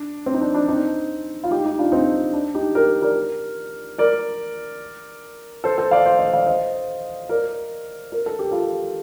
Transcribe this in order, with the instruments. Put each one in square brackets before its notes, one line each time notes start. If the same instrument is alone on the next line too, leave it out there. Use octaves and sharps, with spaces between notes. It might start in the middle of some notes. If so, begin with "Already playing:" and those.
Already playing: [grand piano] D4
C4
D#4
D4
D4
C4 D#4
F4
D#4 G4
D#4 G4
D4 F4
C4 D#4
D4
D#4 G4
G4 A#4
A#4 D5
A#4 D5
A4 C5
A4 C5
D5 F5
C5 D#5
C5 D#5
D5 F5
C5 D#5
A#4 D5
A#4
A4
G4
F4 A4